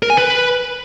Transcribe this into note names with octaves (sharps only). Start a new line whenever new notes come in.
A#4
G#5
B4